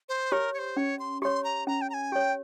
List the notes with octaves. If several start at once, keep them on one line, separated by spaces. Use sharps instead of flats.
C5
G4 A#4 C#5
C#5
C5
C#4 C#5
C6
G4 C#5 C6
A#5
C#4 A#5
G5
A#5
G#5
G4 C#5 G5